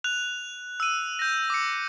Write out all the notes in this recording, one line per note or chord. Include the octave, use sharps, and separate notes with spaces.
F#6 F7
E6 D#7
G6 A#6
D6 C#7